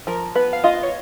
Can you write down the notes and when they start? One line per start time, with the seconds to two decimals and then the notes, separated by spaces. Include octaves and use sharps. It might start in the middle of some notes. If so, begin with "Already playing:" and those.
0.07 F3 A#4
0.35 B3 B4
0.53 F5
0.64 F4 D#5
0.83 C#5